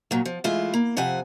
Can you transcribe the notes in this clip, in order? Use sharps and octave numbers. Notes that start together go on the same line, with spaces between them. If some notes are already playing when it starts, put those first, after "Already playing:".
A#2 F#3
F3
E3 G#3 A3 E4 F4
A#3
F2 C3 F3 F#5 G#5